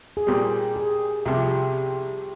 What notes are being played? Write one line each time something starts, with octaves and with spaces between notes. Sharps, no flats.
G#4
A#2 G3 C4 G4
G#4
C2 C3 F3 G4